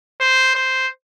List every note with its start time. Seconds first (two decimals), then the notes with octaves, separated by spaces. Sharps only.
0.21 C5
0.55 C5